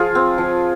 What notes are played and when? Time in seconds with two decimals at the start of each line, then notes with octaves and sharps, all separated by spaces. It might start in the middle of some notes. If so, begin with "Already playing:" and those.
Already playing: F3 F4 G#4
0.15 C4
0.38 F3